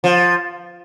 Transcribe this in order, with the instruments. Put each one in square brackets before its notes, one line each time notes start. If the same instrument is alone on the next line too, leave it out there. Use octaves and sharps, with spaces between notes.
[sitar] F3